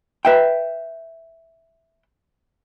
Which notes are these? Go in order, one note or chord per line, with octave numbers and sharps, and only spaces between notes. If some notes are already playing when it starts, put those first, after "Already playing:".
B4 E5 G5